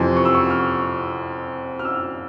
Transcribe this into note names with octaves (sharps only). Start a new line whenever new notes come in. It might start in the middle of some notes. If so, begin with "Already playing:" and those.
Already playing: F2 C3 E3 C6
C#6
E6
C#6
F6
F6
E6